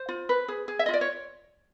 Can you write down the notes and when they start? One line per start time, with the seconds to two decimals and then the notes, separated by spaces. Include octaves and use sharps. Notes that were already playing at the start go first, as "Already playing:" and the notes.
Already playing: C5
0.09 F4
0.29 B4
0.48 G#4
0.68 G#4
0.79 E5
0.86 F4 D#5
0.94 D5
1.01 C#5